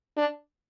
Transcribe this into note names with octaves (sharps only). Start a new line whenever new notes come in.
D4